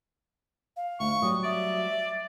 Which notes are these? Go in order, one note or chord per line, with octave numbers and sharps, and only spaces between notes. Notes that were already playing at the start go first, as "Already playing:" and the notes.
F5
D2 C#6
F#3 G3 D#6
D5 E5